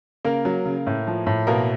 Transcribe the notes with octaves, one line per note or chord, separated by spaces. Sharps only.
C#3 A#3 A#4
F#3
C#3
A2
F3
A2
B2 A#3 A#4